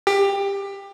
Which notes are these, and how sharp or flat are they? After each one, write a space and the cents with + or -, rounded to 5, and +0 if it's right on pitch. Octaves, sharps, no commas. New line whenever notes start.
G4 +20